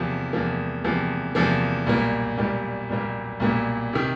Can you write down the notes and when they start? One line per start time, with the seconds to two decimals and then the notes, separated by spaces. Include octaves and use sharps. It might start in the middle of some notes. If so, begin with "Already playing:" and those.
Already playing: E2 C3 F3 A#3
0.33 E2 C3 F3 A#3
0.84 E2 C3 F3 A#3
1.35 E2 C3 F3 A#3
1.87 B1 A#2 G3 A#3
2.38 B1 A#2 G3 A#3
2.89 B1 A#2 G3 A#3
3.40 B1 A#2 G3 A#3
3.93 C3 D#3